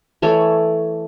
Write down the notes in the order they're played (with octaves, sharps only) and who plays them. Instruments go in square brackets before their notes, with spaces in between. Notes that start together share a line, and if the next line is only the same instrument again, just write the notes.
[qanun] E3 A3 A4 C#5